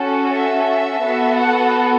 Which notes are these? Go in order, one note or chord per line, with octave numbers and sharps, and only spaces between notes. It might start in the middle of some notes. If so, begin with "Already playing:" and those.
Already playing: C#4 F#4 A4
E5
B3 F#4 A4
F#5